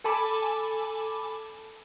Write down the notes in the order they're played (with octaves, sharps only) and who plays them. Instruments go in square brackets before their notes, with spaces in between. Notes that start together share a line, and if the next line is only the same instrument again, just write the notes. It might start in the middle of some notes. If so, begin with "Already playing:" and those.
[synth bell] A4 G#5 A5 B5 D6